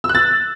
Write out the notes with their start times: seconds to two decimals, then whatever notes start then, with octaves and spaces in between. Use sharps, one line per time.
0.04 E6
0.09 F#6
0.15 A6